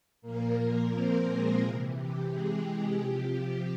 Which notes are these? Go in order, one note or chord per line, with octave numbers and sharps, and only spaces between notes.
A#2 F3 A#3 A#4
C4 C5
G#3 G#4
C3 E3
G4
G#3 G#4
C3 F3 G4